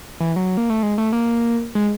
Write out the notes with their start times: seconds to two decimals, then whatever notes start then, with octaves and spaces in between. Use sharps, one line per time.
0.20 E3
0.36 F#3
0.57 A#3
0.70 A3
0.83 G#3
0.98 A3
1.13 A#3
1.75 G#3